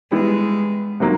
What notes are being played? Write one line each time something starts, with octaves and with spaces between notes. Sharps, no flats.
E3 G3 G#3 B3 E4
C3 D#3 F#3 A#3